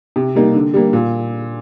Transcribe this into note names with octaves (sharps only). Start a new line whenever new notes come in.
C3
G3 A#3 D#4
D3
G3 A#3
A#2